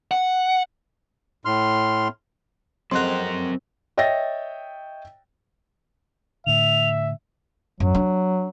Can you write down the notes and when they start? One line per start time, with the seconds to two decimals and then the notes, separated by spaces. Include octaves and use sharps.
0.11 F#5
1.45 A2 C6 F6
2.91 F2 F#3 G#3 C4 A#4 F#5 C6 F#6
3.97 C#5 D#5 E5 G5 A6 A#6
6.47 A2 D3 E5 F7
7.80 F#2 F#3
7.95 D4